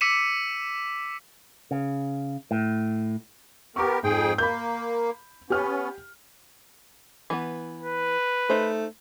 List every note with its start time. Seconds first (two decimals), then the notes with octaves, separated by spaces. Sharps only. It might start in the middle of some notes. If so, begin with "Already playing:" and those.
0.01 D6 E6 B6 C#7 D#7 E7
1.71 C#3
2.51 A2
3.76 B3 G4 A#4 C#6 D6
4.03 F2 G#2 G#4 G5
4.38 A#3 B5 G6
5.50 B3 C#4 G4 F6
7.30 E3 B3
7.83 B4
8.50 A3 D#4 C5